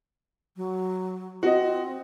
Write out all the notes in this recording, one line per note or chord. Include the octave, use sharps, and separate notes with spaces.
F#3
C4 F#4 D#5